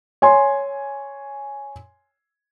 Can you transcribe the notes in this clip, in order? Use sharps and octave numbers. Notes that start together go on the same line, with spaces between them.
C#5 G#5 C6